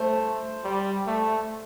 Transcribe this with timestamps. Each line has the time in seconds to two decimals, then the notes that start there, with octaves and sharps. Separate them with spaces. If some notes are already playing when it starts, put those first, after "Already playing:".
Already playing: A3 C5
0.64 G3
1.06 A3